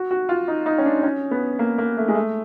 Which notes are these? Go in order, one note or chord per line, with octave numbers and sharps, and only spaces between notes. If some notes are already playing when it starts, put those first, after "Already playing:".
Already playing: F#4
F#4
F4
D#4
D#4
C#4
D4
C#4
B3
A#3
A#3
A3
G#3
A3